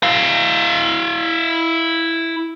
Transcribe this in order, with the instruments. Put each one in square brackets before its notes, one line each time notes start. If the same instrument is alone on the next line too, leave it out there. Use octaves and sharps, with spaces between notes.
[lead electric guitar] E4 F5